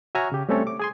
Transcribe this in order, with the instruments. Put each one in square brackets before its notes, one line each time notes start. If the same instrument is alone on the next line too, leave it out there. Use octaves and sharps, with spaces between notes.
[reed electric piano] F#4 C#5 E5 G#5 A#5 F6
C#3 G4
G3 A3 C4 C#4 A4 C#5
D6
G#4 G#5 C6